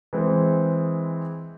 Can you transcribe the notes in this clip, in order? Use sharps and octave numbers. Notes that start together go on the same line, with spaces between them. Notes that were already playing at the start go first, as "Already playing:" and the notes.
E3 G#3 C4